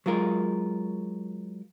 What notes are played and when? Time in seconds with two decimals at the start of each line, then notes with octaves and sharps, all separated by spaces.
0.06 F#3 G#3 F4 A#4